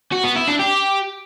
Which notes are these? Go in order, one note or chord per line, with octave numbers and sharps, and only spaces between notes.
F#4
B3
E4
D4
G4